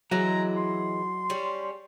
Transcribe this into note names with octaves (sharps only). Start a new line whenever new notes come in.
E3 F#3 G#3 E4 A#5
C6
G3 C#4